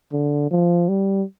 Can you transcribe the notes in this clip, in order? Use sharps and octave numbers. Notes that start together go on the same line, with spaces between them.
D3
F3
G3